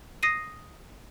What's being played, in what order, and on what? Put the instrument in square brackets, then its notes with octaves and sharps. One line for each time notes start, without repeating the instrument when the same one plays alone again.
[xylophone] D#6 A#6 C7 D#7